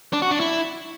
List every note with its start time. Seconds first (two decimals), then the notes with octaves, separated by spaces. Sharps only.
0.13 D4
0.22 F#4
0.31 D4
0.40 E4